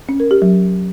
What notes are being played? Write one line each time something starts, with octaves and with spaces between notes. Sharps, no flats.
C#4
A#4
G4
F#3